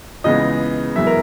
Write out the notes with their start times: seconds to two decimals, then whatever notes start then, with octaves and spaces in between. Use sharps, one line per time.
0.24 C#2 C#3 E3 G#3 B3 D#5
0.96 F#2 E3 G#3 B3 E5
1.07 A#4